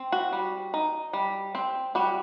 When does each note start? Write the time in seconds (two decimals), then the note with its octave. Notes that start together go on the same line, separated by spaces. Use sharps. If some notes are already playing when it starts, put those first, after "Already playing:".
Already playing: C4
0.12 F#4
0.33 G3
0.74 D#4
1.13 G3
1.55 C4
1.95 G3 F#4